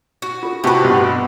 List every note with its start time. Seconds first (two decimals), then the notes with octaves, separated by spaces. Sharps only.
0.22 F#4
0.43 F4 A4
0.64 A2 C3 F#4 G4 B4 G5 A5 C#6
0.85 G2 B2 F#5 C6